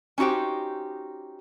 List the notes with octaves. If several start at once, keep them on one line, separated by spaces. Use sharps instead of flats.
C#4 D#4 F#4 G4 C5